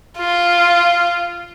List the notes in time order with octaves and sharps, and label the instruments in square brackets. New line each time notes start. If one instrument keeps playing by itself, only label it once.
[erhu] F4